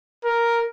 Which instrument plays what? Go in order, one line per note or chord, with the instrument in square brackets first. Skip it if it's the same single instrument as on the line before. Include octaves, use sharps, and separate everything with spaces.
[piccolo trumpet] A#4